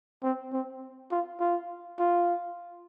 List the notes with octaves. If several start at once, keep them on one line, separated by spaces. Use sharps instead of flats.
C4
C4
F4
F4
F4